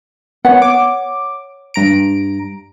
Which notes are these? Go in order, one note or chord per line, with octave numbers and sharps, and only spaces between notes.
B3 C#5 F#5
D6
G2 A#5 D7